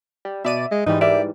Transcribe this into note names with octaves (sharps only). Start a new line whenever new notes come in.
G3
B2 D5 E5 D#7
G#3 D#5
G#2 E3 G3 D#4
G4 A#4 D5 E5